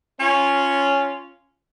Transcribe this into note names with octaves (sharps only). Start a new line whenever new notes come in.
C#4 F4